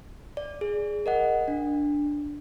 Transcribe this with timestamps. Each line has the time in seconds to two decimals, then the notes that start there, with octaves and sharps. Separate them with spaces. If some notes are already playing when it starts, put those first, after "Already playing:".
0.37 D5
0.61 G#4
1.06 A#4 D#5 F#5
1.48 D4